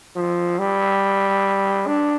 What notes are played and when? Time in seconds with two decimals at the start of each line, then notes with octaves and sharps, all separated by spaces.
0.16 F3
0.59 G3
1.87 D4